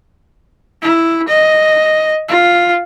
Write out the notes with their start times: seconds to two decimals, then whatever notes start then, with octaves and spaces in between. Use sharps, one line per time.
0.82 E4
1.28 D#5
2.28 F4